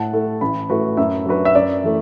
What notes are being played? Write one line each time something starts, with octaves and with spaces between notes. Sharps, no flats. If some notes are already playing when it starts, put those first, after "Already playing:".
Already playing: A2 F#5 A5
A3 E4 A4
A1 B5
A2 A3 F#4 B4
F#2 E5
F#3 D4 F#4 B4
E5
F#2 D5
E3 A3